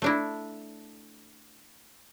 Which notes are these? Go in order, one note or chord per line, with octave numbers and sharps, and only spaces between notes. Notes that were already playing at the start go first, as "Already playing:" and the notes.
A3 D4 E4